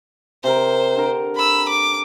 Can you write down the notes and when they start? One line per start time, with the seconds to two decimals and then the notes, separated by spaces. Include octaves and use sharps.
0.44 C3 A#4 C5
0.96 D3 A#4
1.36 B5 E6
1.69 D6